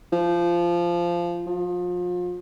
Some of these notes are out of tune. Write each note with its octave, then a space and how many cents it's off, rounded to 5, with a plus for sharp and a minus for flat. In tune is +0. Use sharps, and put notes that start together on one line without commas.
F3 -15
F3 +30